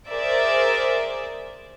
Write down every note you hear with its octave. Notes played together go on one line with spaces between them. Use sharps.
G#4 A#4 C5 D5 E5